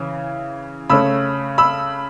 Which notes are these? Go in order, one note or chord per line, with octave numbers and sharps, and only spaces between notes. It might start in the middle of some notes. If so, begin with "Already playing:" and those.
Already playing: C#3 E3 C#4
C#3 A3 C#4 B5 E6
B5 E6